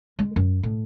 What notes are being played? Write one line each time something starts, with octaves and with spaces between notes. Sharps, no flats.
G#3
F#2
A2